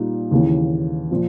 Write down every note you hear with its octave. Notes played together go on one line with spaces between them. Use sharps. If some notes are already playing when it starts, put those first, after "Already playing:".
Already playing: A#2 G3 A#3 D#4
D#2 C#3 E3
A#2 F3